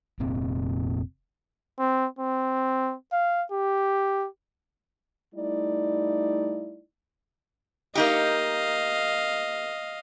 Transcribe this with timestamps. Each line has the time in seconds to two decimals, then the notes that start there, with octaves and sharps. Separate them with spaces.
0.19 F1 A#2 C4
1.79 C4
2.19 C4
3.12 F5
3.51 G4
5.34 G3 A3 D#4 E4 D5
7.95 A#3 D#4 G4 D#5 F5